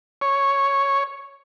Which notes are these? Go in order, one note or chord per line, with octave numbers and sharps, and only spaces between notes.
C#5